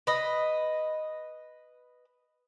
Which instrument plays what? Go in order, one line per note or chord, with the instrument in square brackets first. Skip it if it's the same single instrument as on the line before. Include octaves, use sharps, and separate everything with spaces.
[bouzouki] B4 D#5